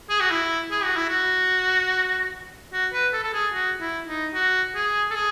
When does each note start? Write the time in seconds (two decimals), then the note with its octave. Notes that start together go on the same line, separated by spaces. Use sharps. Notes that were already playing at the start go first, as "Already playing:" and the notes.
0.10 G#4
0.20 F#4
0.31 E4
0.71 G#4
0.83 F#4
0.96 E4
1.09 F#4
2.73 F#4
2.93 B4
3.13 A4
3.24 A4
3.33 G#4
3.53 F#4
3.80 E4
4.07 D#4
4.34 F#4
4.75 G#4
5.10 A4
5.15 G#4